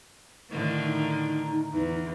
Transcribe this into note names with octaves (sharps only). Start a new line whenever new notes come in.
A2 D3 D#3
D#4
E2